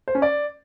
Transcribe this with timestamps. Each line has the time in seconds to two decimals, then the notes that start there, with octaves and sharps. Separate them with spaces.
0.08 C5
0.15 C#4
0.22 D5